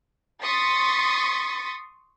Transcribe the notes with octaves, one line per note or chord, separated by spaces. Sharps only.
C6 C#6 D#6 A6 B6 C#7